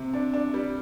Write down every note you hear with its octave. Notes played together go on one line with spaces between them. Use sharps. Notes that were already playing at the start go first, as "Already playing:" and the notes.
Already playing: C3
D4
D4
G3